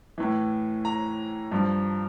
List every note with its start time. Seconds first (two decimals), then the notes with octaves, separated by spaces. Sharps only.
0.18 A2 E3
0.85 A#5
1.52 G2 F3